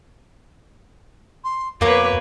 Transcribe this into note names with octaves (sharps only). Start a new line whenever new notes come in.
C6
F2 B2 A#3 B4 C#5 D6